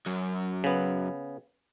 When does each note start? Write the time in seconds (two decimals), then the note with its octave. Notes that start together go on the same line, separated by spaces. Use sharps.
0.06 F#2 F#3
0.64 C#3 B3